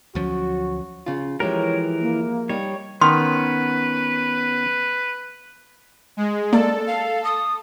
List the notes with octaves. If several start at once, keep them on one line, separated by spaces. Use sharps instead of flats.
D2 F3 F#3 C#4 F#4
C#3 F4
E3 F3 G#3 G4 A#4 C#5
A#3
G3 D#4 C#5
D#3 B3 C#4 B4 C6
G#3
A#3 A4 A#4 D5
F5
D#6